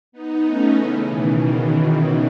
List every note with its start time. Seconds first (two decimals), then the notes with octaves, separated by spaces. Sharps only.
0.12 B3 D#4
0.44 A3 C#4
0.76 C#3 E3
1.08 B2 D#3